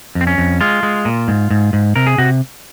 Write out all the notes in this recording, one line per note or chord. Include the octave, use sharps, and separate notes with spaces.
F2
C4
C#4
F2
G#3 F4
G#3
A#2
G#2
G#2
G#2
C3 A#4
G#4
C3 F#4